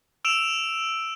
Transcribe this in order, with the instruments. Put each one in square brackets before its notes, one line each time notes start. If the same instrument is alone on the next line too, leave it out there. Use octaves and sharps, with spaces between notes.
[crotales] E6 D7 E7 F7